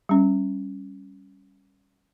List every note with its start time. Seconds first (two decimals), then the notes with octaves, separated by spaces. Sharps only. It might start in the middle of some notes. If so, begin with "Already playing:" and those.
0.09 G3 C#4